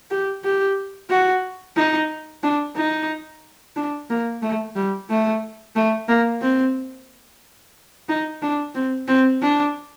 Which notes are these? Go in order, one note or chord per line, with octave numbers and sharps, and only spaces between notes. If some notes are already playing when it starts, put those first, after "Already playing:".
G4
G4
F#4
D#4
D4
D#4
D4
A#3
A3
G3
A3
A3
A#3
C4
D#4
D4
C4
C4
D4